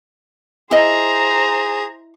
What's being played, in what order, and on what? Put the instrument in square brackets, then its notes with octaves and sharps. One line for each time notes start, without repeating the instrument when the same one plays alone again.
[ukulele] E4 D#5 [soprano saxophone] G#4 [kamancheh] C5 A#5